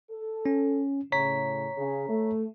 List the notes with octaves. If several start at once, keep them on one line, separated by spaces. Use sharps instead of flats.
A4
C#4
A2 C#3 C#5 A#5 B6
C#3
A3